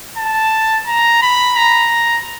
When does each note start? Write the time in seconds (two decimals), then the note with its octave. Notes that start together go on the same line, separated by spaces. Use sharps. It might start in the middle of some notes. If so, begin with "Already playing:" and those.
0.18 A5
0.87 A#5
1.22 B5
1.57 A#5